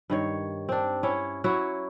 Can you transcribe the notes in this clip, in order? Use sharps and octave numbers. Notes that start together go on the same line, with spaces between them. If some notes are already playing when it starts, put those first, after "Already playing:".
G2 D#3 C#5
C4 D4
C#4 E4 C#5
F#3 E4 F#4 C#5